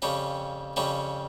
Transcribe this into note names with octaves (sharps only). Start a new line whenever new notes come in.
F2 C#3 G3 C#4 F4
F2 C#3 G3 C#4 F4